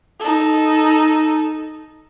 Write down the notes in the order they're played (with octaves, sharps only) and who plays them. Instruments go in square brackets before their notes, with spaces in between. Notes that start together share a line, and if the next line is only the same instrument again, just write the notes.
[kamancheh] D#4 A4